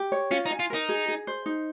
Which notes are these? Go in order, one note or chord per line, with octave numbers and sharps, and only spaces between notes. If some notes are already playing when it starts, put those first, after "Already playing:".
Already playing: G4
C#5
C#4 F4
D#4
G#5
F4
D#4 A#4
G#4
G#4
C5
D#4